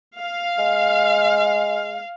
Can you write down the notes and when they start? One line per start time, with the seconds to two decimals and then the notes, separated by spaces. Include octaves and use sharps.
0.19 F5
0.59 G#3